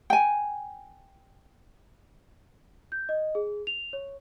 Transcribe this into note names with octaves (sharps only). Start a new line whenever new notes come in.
G5 G#5
G6
D#5
G#4
F7
C#5